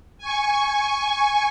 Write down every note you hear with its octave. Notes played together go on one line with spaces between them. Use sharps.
G#5 C#6